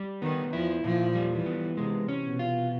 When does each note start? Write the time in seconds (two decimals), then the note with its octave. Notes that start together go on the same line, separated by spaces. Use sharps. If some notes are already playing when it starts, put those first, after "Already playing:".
Already playing: G3
0.22 D#3 B3
0.53 F3 E4
0.84 A#2 F3
1.15 G3
1.31 E3
1.46 B3
1.77 C3 G#3
2.08 C#4
2.23 B2
2.39 F4